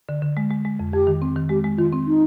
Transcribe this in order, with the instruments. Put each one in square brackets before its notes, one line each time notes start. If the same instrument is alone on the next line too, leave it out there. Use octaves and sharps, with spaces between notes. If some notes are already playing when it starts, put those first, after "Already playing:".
[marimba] D3
D3
G#3
G#3
G#3
F2
[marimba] F2 [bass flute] G4
[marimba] D#3
C4
D#3
[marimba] G#3 [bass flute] G4
[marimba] G#3
[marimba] D#3 [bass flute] F4
[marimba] C4
[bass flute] D#4